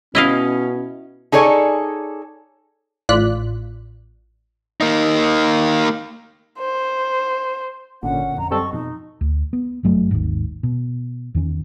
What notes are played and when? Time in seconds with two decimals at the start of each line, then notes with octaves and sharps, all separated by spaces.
0.15 B2 C#4 E4 D#5 F5
1.32 D#4 G#4 A4 C#5 D5 G#5
3.09 A1 A2 F4 D5 F#6 B6
4.81 A#3 D#4
6.58 C5
8.03 G#1 A#2 D3 C#4 F#5
8.38 F2 A#5
8.51 F#2 G3 C4 A4 D#5 C#6
8.73 F2 B2 D#4
9.21 D2
9.53 B3
9.83 G1 F#2 F#3 A3
10.11 G#1 D#2 G#2
10.63 B2
11.34 E2 D#3 C#4